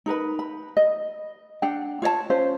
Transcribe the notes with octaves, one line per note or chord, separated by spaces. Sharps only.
D#4 A#4 B4 B5
B5
D#5
D4 F#5 G5
F4 C#5 D5 A5
C#4 F4 C5